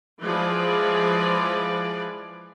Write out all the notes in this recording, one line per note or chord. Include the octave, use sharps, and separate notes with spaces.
E3 F3 G#3 G#4 B4 D5